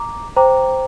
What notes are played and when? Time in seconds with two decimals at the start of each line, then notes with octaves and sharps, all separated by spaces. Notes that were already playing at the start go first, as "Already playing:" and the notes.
Already playing: A#5 D6
0.36 C5 G5 A#5 D6